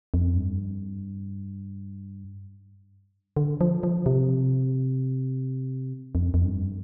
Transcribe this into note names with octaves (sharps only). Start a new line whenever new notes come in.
F2
G2
D3
F3
F3
C3
F2
F2
G2